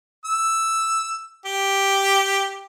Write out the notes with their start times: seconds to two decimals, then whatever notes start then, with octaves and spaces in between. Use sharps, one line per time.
0.25 E6
1.46 G4